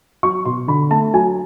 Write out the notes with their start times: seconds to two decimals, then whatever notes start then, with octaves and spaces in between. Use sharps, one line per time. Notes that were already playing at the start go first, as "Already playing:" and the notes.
0.23 F#3 C#6
0.45 B2 C6
0.68 D3 B5
0.91 A3 A5
1.14 F#3 G#5